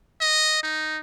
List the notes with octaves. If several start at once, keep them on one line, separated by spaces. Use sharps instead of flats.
D#5
D#4